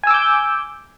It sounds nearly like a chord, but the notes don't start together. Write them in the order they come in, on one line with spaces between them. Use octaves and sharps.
G#5 E6 D6 G6